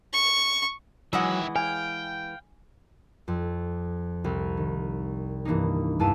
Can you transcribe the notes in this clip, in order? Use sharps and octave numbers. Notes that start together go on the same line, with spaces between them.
C#6
D#3 E3 F#3 G#3 E5 F#5
F5 G5 G#5
F2
C2
D#3
G2 E3 A#3 D4 D#4
E2 G2 E4 F5 A5 D#7